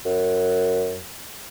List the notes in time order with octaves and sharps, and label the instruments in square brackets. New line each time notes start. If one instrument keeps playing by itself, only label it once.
[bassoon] F#2